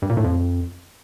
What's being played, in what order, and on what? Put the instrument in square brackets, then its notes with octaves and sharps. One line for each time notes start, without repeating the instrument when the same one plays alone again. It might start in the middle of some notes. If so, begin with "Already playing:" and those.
[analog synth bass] G2
A#2
A2
F2